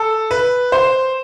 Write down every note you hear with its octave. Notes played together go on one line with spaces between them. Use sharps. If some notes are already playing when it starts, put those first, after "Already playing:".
Already playing: A4
B4
C5